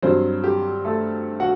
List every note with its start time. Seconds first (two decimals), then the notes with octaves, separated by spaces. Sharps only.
0.02 G2 F#3 C4 C5
0.44 G4
0.85 A3 A4
1.40 F#4 F#5